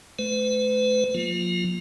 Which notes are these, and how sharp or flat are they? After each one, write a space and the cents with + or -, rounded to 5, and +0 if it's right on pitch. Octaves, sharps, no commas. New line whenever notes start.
A3 -35 B4 +45
F3 +45 A#3 +0 F4 +0